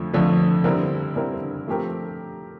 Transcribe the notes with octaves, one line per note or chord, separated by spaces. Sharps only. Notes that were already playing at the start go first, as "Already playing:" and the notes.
Already playing: F2 D3 F3 A3
F2 D3 F3 A3
D3 G3 C4 E4 A#4
D3 G3 C4 E4 A#4
F3 A3 C4 G4 A#4